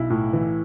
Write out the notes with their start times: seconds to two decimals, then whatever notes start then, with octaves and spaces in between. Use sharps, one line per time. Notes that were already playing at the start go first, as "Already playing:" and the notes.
Already playing: B1 E4
0.10 A2
0.33 E3